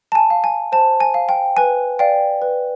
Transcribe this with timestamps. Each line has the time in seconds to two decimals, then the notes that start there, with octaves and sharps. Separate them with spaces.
0.12 A5
0.15 G#5
0.30 F5
0.44 G#5
0.72 C5 A5
1.00 G#5
1.14 F5
1.29 G5
1.57 B4 G#5
1.99 D5 F5 G5
2.42 B4